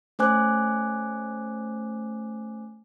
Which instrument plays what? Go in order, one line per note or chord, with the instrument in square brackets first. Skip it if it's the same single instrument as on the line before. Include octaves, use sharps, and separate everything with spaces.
[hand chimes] A3 C#4 C5 G#5 D6 F#6